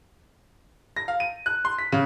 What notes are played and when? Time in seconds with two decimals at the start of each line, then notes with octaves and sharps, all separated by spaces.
0.97 A#6
1.08 F5
1.20 D#7
1.46 F#6
1.65 C6
1.78 B6
1.92 C#3